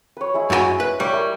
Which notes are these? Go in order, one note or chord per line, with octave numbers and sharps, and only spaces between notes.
B4 C#5
G#3 E4
F#2 F#4 G#5 B5
B4
G3 C#5 G5
E4 A#4 C#6